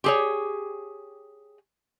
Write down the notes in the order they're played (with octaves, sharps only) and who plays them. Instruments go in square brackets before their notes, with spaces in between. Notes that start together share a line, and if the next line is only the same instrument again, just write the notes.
[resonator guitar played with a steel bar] G4 G#4 C#5